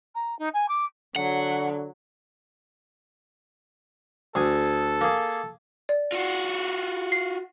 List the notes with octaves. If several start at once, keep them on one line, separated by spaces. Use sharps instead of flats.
A#5
D#4
G#5
D6
D3 F#3 F#5
D2 G#4 A4 G#5
A#3 G#4
D5
F4 F#4
C7